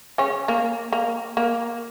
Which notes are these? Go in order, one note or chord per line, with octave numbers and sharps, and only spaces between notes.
C#3 C#4
A#3
A#3
A#3